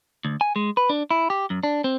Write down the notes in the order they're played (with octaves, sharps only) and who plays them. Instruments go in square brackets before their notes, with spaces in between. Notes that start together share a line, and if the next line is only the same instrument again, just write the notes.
[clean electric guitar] D2
G#5
G#3
B4
D4
E4
G4
F#2
D4
C4